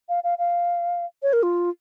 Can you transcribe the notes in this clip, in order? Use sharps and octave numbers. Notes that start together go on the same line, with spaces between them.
F5
F5
F5
C#5
A#4
F4